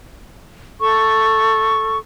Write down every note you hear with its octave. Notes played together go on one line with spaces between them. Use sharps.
A4 C#6